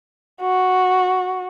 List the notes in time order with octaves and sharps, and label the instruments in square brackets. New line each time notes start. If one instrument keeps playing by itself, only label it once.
[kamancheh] F#4